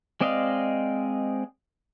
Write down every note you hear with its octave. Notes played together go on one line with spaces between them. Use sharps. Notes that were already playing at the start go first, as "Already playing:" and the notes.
G#3 C4 D5 D#5 F5